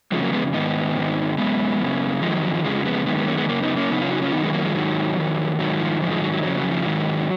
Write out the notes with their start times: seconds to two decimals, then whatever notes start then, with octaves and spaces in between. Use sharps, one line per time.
0.12 F2 C#3 F3 G#3
0.22 F#3 A#3
0.33 G#3 B3
0.53 G#2 D#3 B3 D#4
0.96 G#2 D#3
1.38 C#3 G#3 B3
1.41 F#2
1.80 F#2 C#3
2.22 F2 D#3 F3 G#3
2.33 F#3
2.43 F#3
2.54 F3
2.64 F2 C#3 F3 G#3
2.85 G#3 B3
3.06 F#2 D#3 G#3 B3
3.17 G#3 B3
3.27 A#3 C#4
3.37 G#3 B3
3.48 F#2 C#3 A#3 C#4
3.62 B3 D#4
3.76 A#3 C#4
3.90 F#2 C#3 B3 D#4
4.01 C#4 F4
4.11 D#4 F#4
4.22 C#4 F4
4.32 F#2 D#3 B3 D#4
4.43 G#3 B3
4.53 F#3 A#3
4.64 F3 G#3
4.75 G#2 D#3 F#3
5.17 F2 D#3
5.59 G#2 D#3 F#3
5.80 F3
6.01 G#2 F3
6.04 D#3
6.11 F3 G#3
6.22 F#3
6.32 F#3
6.43 F2 C#3 F#3
6.57 F#3
6.71 F3
6.85 G#2 D#3 F#3